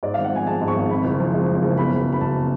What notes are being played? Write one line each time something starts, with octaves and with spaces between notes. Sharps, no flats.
G#2 D5
G#1 F5
F#5
F3 G#5
G#3 A5
G#2
C#6
G#1
F2 B5
F#1
F3
G#3
F2
F#1
B2 B5
C#2
F#3
B5
C#2 A5
B2